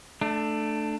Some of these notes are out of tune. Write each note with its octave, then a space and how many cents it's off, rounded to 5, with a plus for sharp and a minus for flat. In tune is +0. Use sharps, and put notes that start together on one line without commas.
A3 +0 D4 +20